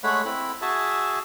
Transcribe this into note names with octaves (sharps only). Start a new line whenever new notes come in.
G#3 A3 C#5 F#5 B5
C4 E4 B5
F#4 G#4 E5 G#5 A5